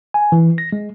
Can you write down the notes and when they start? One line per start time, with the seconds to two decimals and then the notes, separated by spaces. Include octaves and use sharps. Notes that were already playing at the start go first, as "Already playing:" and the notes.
0.14 G#5
0.32 E3
0.58 A#6
0.72 G#3